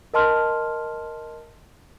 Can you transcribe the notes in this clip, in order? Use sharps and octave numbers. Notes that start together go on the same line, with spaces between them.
A#4 D#5 A5 C6 F6